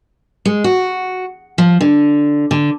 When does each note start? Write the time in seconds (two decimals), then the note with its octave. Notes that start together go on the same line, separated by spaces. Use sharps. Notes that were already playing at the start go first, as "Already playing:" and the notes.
0.45 G#3
0.64 F#4
1.58 F3
1.81 D3
2.51 D3